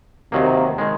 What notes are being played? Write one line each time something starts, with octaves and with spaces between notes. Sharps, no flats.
D#2 C3 D#3 F#3 A#3
D#3 G#3